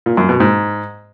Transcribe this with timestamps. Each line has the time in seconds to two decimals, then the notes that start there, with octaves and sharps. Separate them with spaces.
0.06 A#2
0.17 F#2
0.29 B2
0.40 G#2